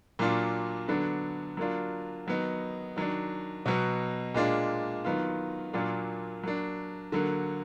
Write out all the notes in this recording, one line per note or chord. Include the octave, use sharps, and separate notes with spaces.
A#2 F#3 D4 F4
D3 F#3 B3 D4
F#3 A#3 D4 F4
D#3 F#3 B3 D#4
D#3 F#3 D4
B2 F#3 B3
A#2 G#3 D4 F4
D#3 F#3 B3 F4
A#2 F#3 A#3 D4 F4
F#3 A#3 D4
D3 F#3 A#3